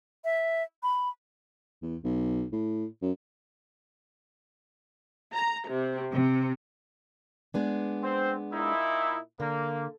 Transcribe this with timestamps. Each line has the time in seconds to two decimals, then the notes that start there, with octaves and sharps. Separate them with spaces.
0.24 E5
0.83 B5
1.82 E2
2.04 B1
2.52 A2
3.02 F#2
5.33 A#5
5.69 C3
6.11 C3
7.54 G#3 B3 D4
8.03 C4 C5
8.53 A#2 D#4 E4
9.40 D3 A#3